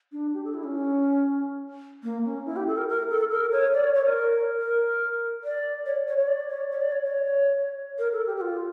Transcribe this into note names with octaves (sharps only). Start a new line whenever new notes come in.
D4
G4
A4
E4
C#4
A#3
C#4
E4
G4
A4
A#4
A#4
A4
A#4
C#5
D5
C#5
C#5
A#4
A#4
D5
C#5
C#5
C#5
D5
C#5
C#5
D5
C#5
C#5
A#4
A4
G4
G4
F4